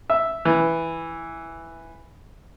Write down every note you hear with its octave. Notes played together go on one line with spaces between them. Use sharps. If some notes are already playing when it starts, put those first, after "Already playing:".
E5
E3